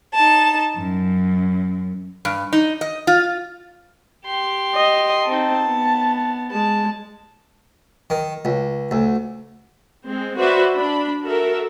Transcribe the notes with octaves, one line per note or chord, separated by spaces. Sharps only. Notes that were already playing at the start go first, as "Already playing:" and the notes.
D#4 A5
F#2
G2
D#4
D#5
F4
G4 C6
D#5
C4 D#4 A5
B3
G#3 A5
D#3
C#2
D2
G#3 C4
F#4 B4 C5 D5 E5
D4 B5
F#4 A4 A#4 E5